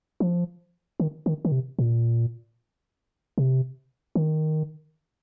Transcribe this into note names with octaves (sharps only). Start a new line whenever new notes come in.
F3
D#3
D#3
D#3
C3
A#2
C3
D#3